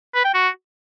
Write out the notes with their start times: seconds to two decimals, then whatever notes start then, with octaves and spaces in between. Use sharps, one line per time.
0.15 B4
0.25 G5
0.34 F#4